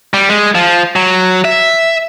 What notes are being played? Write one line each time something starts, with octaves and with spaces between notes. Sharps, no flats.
G3
G#3
F3
F#3
E5